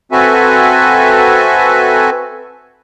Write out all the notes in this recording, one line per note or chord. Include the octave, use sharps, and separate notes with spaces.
C4 F#4 A4 B4 E5 G#5